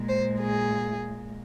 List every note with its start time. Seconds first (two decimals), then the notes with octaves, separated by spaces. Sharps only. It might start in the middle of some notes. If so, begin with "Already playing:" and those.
Already playing: A#2 G#3
0.09 C5
0.40 G#4